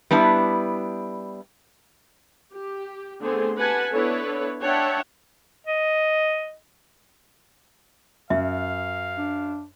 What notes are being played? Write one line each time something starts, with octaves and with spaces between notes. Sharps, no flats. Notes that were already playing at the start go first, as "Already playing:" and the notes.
G3 B3 D4 E4
G4
D3 A3 B3 C4 G#4 C5
G4 B4 F#5 G#5 A5
B3 D4 E4 A4 B4 C#5
D4 C#5 E5 F#5 G5 A5
D#5
F#2 E5 F5
D4